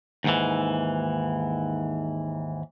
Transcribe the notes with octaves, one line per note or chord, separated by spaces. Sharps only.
D#2 G#2 E3